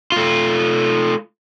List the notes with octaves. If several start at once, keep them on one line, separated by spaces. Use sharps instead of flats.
A3 F4